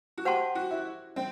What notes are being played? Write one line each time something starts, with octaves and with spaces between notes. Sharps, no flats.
F#4
G4 C5 F#5 A5 C6
F#4
E4
C4